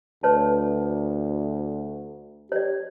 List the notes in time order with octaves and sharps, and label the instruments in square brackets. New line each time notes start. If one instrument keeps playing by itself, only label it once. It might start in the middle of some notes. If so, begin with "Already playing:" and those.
[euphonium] D2 [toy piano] B4 C#5 A5
[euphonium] G4 [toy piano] C#5 D5